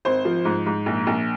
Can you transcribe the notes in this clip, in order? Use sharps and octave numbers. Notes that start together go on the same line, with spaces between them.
G#1 C5
F3
G#2
G#2
A#1
A#1